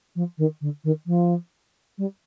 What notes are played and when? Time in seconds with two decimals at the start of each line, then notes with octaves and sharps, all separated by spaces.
0.15 F3
0.38 D#3
0.61 D3
0.84 D#3
1.06 F3
1.98 G3